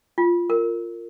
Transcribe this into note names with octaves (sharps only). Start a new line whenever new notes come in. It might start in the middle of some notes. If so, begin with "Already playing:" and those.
F4
A#4